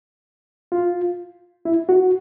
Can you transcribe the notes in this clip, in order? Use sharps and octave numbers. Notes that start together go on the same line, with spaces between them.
F4
E4
F#4